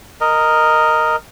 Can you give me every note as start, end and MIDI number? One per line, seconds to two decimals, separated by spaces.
0.21 1.16 70
0.21 1.16 75